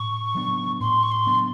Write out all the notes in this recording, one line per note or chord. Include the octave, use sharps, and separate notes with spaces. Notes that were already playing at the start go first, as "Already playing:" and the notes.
Already playing: A2 C#6
F#3 B3 D4
A2 C6
C#6
C6
F#3 B3 D4